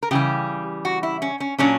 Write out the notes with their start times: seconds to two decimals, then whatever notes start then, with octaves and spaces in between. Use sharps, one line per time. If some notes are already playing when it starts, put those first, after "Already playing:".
0.03 A#4
0.11 C#3 E3 G3 G4
0.85 F#4
1.03 E4
1.22 C#4
1.40 C#4
1.58 A#2 F#3 C#4 D4